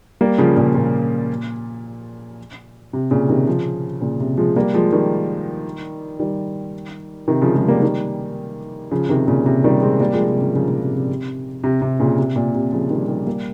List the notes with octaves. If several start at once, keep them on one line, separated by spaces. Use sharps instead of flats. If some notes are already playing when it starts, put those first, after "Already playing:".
G3 A#3
C#3 F3
A#2 C#3
A#2
C3
A#2 C#3
C3 D#3
C#3 F3
A#2 C#3
C3
F3 G#3
G3 A#3
F3 G#3
D#3 G3
D#3 G3
C3 D#3
C#3 F3
F3 G#3
G3 A#3
D#3 G3
C#3 F3
C3 D#3
A#2 C#3
C3
D#3 G3
G#3 C4
G3 A#3
F3 G#3
C3
C#3 F3
C#3 F3
A#2 C#3
C3
C3
C3
C3
C3
A#2 C#3
C3
A#2
C3
C#3 F3
D#3 G3
D#3 G3
G3 A#3